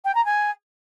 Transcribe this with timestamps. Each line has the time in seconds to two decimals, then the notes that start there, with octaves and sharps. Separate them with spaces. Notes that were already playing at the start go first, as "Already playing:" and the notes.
0.05 G5
0.15 A#5
0.25 G#5